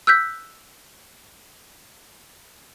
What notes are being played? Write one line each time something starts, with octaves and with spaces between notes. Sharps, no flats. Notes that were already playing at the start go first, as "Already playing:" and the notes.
E6 F#6 G6 B6